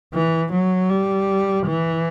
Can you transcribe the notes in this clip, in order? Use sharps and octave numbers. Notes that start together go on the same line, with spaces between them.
E3
F#3
G3
E3